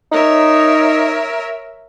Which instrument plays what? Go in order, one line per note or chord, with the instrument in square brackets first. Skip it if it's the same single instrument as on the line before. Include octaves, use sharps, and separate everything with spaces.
[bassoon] D#4 [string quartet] A#4 C#5 E5